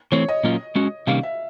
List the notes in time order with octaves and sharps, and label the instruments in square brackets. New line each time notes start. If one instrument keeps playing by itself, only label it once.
[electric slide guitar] E3 A3 C4 [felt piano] C#5
[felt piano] D#5
[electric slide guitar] A#2 F#3 A#3 C#4 F4
G#3 C#4 F#4
[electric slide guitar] C3 D#3 G3 A#3 C#4 [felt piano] F5
[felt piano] E5